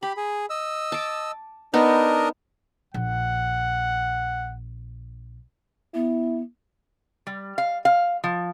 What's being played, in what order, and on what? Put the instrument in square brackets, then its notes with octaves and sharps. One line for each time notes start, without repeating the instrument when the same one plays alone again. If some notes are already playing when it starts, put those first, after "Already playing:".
[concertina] G4 [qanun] B5
[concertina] G#4
D#5 E6
[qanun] A5 D6
[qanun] B3 D#4 [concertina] D4 A#4 D#5
[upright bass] A#1 [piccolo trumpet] F#5
[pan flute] B3 [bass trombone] E4
[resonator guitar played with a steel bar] G3
F5
F5
F3